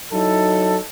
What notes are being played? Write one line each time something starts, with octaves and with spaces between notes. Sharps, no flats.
F#3 D#4 E4 A4